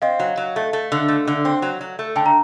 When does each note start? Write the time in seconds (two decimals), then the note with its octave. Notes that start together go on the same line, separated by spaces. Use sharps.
0.02 C4 D#5 F5
0.20 F#3
0.37 F#3
0.56 A3
0.73 A3
0.92 D3
1.08 A3
1.28 D3
1.45 C4
1.62 F#3
1.81 F#3
1.99 A3
2.16 D3 G5 A5
2.26 A#5